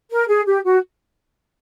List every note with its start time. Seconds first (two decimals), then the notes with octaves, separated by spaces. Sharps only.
0.11 A#4
0.28 G#4
0.46 G4
0.65 F#4